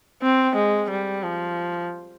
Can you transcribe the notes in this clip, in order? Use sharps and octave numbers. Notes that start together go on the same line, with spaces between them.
C4
G#3
G3
F3